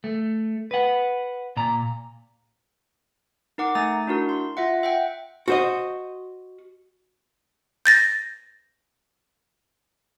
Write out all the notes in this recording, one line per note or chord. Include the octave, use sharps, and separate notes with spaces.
A3
B4 F#5
A#2 A#5
D#4 A#4 F#5 D6
A3 D#4 G#5 A#5 A6
D4 E4 F#4 A#4
C6
F4 E5 F#5
E5 F#5 G5
F#4 C5 D#5
G6 A6 A#6